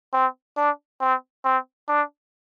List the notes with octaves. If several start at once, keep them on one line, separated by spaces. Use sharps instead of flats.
C4
D4
C4
C4
D4